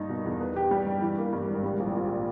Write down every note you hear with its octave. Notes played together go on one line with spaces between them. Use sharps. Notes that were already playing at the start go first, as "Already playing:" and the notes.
Already playing: G2 A#3 D#4
B2
E2
B3
G4
G3
G2
E3
A#3
G2
G#1
G3
A#1
A#2